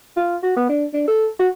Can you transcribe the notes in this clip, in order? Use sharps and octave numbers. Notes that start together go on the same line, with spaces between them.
F4
F#4
B3
D4
D4
A4
F#4